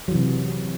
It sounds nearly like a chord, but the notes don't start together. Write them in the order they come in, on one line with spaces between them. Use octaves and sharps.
F#3 E3 C3